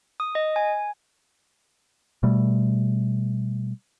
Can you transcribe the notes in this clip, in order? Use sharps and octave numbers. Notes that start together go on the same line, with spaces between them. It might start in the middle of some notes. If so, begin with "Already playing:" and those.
D#6
D#5
G#5
B2 G3 A3